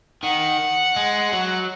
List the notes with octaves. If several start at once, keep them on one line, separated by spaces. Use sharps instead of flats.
D#3 F#5
G#3
F#3